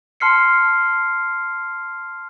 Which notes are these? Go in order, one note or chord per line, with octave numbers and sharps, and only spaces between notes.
A5 C6 F6 C7 C#7